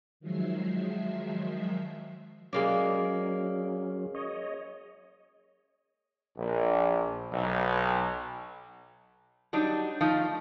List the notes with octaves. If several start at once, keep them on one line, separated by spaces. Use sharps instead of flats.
D#3 F3 F#3 G#3 E5 C7
F#3 G#3 A#3 C#4 D5
C#5 D#5
A#1
B1
F#3 G3 D4 D#4
F3 A3 D#4